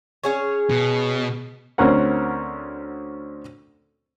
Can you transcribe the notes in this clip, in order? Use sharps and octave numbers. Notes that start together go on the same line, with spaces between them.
C#4 G#4 C#5
B2
D2 C4 C#4 A#4 F#5